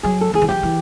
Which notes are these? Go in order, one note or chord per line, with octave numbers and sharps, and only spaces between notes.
F#3 G#4
A4
F3 G#4
E3
F3 G4
E3